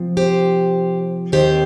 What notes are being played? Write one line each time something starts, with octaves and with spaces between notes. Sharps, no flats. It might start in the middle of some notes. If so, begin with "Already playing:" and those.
Already playing: C3 F3 C4
G4 C5
D#2 D#3 C4 G4 C5